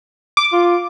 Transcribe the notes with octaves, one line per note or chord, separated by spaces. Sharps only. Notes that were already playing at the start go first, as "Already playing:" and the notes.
D6
F4